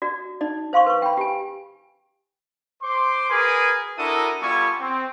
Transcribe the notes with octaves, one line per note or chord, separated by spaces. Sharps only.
F#4 D5
D#4 D5
C5 F5 C6 C#6
B4 C#6
G5 B5
G4 G#5
C5 C6 D6
F#4 G#4 A#4 B4 G#5
D4 E4 F#4 A4 A#4 D#6
G3 B3 F4 A4 G#5 C#6
C4